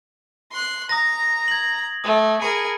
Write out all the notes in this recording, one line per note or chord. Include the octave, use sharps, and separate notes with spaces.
C6 F#6
A#5 D#6 A#6
G#6 F#7
A3 D#6
G#4 A#4 A5 B5 C#7